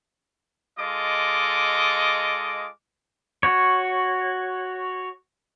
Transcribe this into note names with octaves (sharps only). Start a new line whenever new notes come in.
G#3 F4 A4 D#5 D6
F#4 C#5